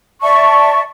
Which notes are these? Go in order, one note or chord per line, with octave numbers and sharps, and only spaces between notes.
D5 E5 A5 C#6